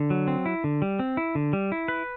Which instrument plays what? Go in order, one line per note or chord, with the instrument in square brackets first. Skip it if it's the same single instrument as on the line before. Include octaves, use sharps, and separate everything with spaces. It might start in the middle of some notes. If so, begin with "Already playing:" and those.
Already playing: [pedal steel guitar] D3
F#3
C4
E4
D3
G3
C4
E4
D3
G3
E4
B4